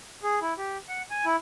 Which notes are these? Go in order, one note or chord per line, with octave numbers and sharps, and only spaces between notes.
G#4
E4
G4
F#5
G#5
E4